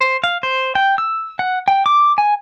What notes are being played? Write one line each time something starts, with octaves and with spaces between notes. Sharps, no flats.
C5
F5
C5
G5
E6
F#5
G5
D6
G#5